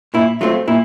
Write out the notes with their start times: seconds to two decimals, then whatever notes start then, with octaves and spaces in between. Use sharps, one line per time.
0.14 A#2 E4
0.41 F#3 A3 C4 F4
0.67 A#2 E4